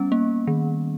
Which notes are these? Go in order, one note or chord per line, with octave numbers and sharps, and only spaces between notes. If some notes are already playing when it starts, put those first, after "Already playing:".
Already playing: G3 B3 C#4
A#3
D#3